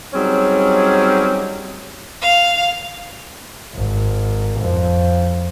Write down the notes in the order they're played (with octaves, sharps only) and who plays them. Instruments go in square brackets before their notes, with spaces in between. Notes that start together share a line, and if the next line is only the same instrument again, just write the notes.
[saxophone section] F#3 G3 C4 C#4 D#4 G#4
[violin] F5
[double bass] G#1
F2